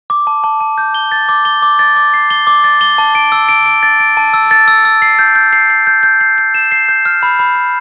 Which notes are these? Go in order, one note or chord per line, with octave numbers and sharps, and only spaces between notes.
D6
A5
A5
A5
G6
G7
A6
D6
G7
D6
A6
D6
C7
G7
D6
A6
G7
A5
D7
E6
D7
D7
A6
D7
A5
E6
A6
E6
E6
C7
G6
G6
C7
C7
G6
G6
C7
G6
E7
C7
G6
F6
B5
B5
B5